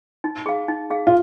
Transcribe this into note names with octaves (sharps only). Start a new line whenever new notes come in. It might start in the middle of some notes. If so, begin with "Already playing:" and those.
D#4
G#4 F5
D#4
G#4 F5
F4